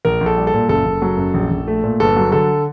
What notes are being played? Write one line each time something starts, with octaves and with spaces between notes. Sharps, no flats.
A#1 A#4
A#1
A4
G3
A4
A#2
F#1 A4
F#1
F#3
F#2
A#1
A#1
A3
A#2
G1 A4
F#3
D3 A4